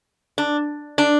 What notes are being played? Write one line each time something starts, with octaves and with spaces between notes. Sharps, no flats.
D4
D4